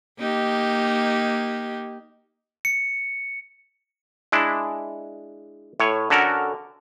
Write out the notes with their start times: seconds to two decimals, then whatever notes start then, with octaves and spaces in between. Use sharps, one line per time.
0.18 A#3 D#4 G4
2.65 C#7
4.32 G#3 D4 E4
5.80 A2 C#5
6.10 D3 C#4 F#4 A4 A#4